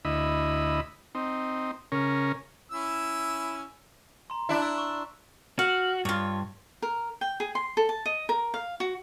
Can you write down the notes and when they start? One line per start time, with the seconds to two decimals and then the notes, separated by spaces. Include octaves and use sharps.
0.05 D2 E4 D#5 B5
1.15 C4 D#4
1.92 C#3 C#4 A#4
2.71 C#4 E4 E6
4.30 A#5 C6
4.49 D4 E4
4.62 E6
4.78 C#6
5.59 F#4 F5
6.05 G2 F4 C#5
6.82 A#4
7.21 G5
7.40 G#4
7.55 C6
7.77 A4
7.89 A5
8.06 D#5
8.29 A#4
8.54 F5
8.80 F#4